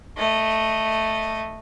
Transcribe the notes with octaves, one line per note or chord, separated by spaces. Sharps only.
A3 D#5